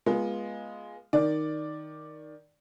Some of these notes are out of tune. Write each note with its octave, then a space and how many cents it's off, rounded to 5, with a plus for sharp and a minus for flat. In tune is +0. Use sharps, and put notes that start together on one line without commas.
G#3 +0 B3 -25 F4 +0
D#3 +0 D5 +0